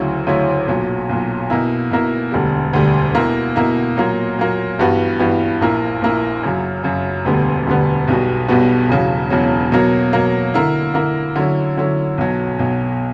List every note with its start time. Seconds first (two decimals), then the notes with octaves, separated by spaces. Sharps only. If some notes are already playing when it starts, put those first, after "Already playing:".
Already playing: D2 C#3 F#3 C#4 E4
0.27 D2 C#3 F#3 C#4 E4
0.68 B1 A#2 F#3
1.09 B1 A#2 F#3
1.50 B2 A#3 E4
1.91 B2 A#3 E4
2.32 E1 D2 D3 G3
2.73 E1 D2 D3 G3
3.14 B2 A#3 E4
3.56 B2 A#3 E4
3.97 A#2 F#3 A#3
4.38 A#2 F#3 A#3
4.79 G2 E3 G3 B3 F#4
5.19 G2 E3 G3 B3 F#4
5.61 A#1 A#2 A#3 E4
6.02 A#1 A#2 A#3 E4
6.43 F#2 C#3 F#3
6.83 F#2 C#3 F#3
7.25 E1 D2 D3 G3 B3
7.67 E1 D2 D3 G3 B3
8.08 B1 B2 G3 B3 F#4
8.48 B1 B2 G3 B3 F#4
8.89 E1 E2 C#3 F#3
9.30 E1 E2 C#3 F#3
9.72 B2 F#3 A#3
10.13 B2 F#3 A#3
10.54 D3 A#3 E4
10.94 D3 A#3 E4
11.36 D3 F#3 C#4 E4
11.77 D3 F#3 C#4 E4
12.18 B1 B2 F#3
12.59 B1 B2 F#3